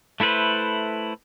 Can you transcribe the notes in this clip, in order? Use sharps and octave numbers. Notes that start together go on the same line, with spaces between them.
A3 E4 A4 B4 C5